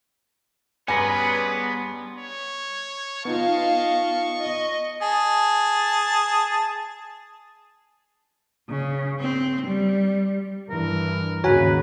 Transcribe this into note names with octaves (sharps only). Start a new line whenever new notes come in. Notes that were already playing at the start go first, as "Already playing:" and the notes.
G2 B3 C#4 G#4 B4 G#5 A#5 C6
C#5
B3 D#4 F4 D#5 F5 A5 C#6
D#5
G#4 A5
C#3
C4
G3
G2 E3 A#4
D#2 G#2 C#3 F#4 B4 C#5 G#5 A#5